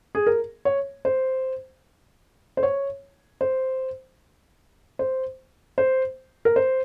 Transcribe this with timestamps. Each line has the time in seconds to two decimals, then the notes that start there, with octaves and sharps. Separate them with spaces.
0.15 G#4
0.27 A#4
0.65 C#5
1.05 C5
2.57 C5
2.63 C#5
3.41 C5
4.99 C5
5.78 C5
6.45 A#4
6.56 C5